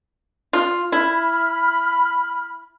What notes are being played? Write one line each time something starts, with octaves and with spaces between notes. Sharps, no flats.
F4
E4 B5 F6